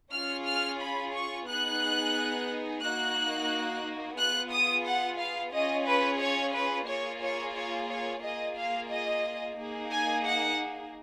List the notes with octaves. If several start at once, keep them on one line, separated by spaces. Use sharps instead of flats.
C#4 F4 G#4 F6
F6
B5
C#6
B3 D#4 G#4 F#6
A#3 D#4 F#4 F#6
B3 F4 G#4 F#6
D#6
F#5
F5
C#4 F4 G#4 D#5
B4
C#5
B4
A#3 F4 G#4 C#5
C#5
C#5
C#5
A#3 F4 G#4 D#5
F5
D#5
A#3 D#4 G#4
G#5
F#5